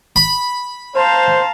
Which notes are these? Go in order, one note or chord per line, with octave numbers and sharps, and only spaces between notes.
B5
C5 F5 A5 A#5